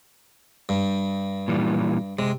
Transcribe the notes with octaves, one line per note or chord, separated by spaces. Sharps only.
G2
A#2 E3 G3
C3 G#3